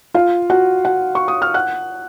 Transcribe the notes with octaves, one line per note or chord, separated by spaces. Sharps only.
F4 F5
F#4 F#5
F#4 F#5
C#6
D#6
F6
F#5 F#6